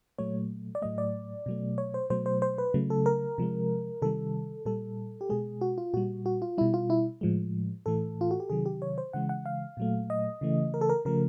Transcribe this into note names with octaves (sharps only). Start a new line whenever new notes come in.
A#2 F#3 A3 C#5
D5
A2 F#3 A3 D#5
D5
B2 F#3 A3
C#5
C5
B2 F#3 A3 C5
C5
C5
B4
C#3 F#3 A3
A4
A#4
C3 F3 G#3
C3 D#3 G3 A4
A#2 G3 A4
G4
B2 G#3 G#4
F#4
F4
A#2 G3 F#4
F#4
F4
B2 G3 E4
F4
E4
A2 F3 G#3
A2 E3 A3 A4
F4
F#4
G4
C3 D#3 F#3 G#4
G4
C#5
C5
C#3 E3 G#3 F#5
F#5
F5
A#2 F#3 A3
D#5
C#3 E3 A3
A#4
A4
A#4
C#3 F3 A3 A#4